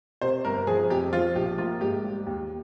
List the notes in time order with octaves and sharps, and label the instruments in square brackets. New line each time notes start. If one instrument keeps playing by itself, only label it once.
[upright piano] C3 C5
G1 A#4
F3 G#4
F2 G4
F3 F4
A#1 G4
A#3 F4
G#2 G4
G3
D#2